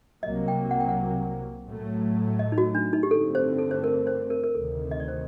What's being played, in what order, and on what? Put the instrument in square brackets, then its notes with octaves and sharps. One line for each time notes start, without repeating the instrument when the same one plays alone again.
[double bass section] C2 C3 F#3 A#3 [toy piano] D#5
[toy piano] G5
F#5
G5
F#5
[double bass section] A2 F#3 A3
[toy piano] D#5
D#4
F#4
D4
D#4
G4
[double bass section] G2 D3 A3 C4 [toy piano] A4
[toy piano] C5
A4
C5
A#4
C5
A#4
A#4
[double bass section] D2 C3 D#3 [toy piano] A4
[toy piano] D#5
D5
C5